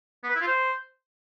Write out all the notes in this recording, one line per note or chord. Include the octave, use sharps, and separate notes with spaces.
B3
B4
E4
F4
C5